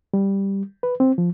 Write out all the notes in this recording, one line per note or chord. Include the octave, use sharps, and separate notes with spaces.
G3
B4
C4
F3